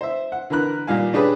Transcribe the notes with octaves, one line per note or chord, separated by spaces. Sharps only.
C5 E5
F#5
D3 E3 A#4 B5 F#6
A#2 D#3 G3 F5 G#5
C#4 D4 G4 G#4 B4